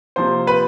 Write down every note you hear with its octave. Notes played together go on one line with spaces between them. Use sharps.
C3 F3 A#3 C5 C6
B4 B5